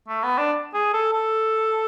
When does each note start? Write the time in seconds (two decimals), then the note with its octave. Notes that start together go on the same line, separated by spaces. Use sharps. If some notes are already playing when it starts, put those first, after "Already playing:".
0.08 A3
0.24 B3
0.38 D4
0.74 G#4
0.94 A4
1.13 A4